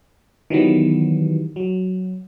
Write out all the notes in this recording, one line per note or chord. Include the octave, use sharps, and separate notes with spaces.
D#3 E3 F#3 G3 B3
F#3